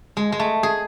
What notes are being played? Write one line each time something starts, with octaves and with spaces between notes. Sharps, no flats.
G#3
G#3
A3
G#4